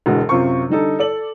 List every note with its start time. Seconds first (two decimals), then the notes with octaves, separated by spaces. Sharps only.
0.06 E1 D2 E3 G#3 F#4
0.29 F#2 C3 F4 C5 C#6
0.69 D3 G3 D#4 A4
0.99 A4 D5 F#7